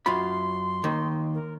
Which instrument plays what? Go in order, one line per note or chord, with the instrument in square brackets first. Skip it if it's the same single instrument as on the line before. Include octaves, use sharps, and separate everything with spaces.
[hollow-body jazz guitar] F#2 F4 B5 [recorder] C6
[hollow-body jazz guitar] D#2 D#3
[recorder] A#4